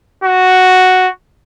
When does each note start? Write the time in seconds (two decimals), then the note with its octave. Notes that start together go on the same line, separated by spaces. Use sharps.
0.24 F#4